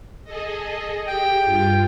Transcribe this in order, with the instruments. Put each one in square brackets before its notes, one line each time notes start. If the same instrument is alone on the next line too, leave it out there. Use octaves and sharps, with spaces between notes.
[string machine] G#4 A4 D#5
[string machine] G4 [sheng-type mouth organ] G5
[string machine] G2 F4